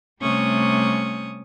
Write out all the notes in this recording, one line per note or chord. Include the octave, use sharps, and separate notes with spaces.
C3 G3 A3 C#4 C#6 D#6